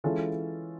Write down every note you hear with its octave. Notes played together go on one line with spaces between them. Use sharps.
E3 G#3 C#4 F4 A4